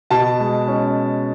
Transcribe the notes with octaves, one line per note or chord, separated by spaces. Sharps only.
B2 A5
G#3
C#4